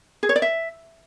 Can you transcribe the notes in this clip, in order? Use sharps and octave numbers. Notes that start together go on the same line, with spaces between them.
G#4
C#5
D5
E5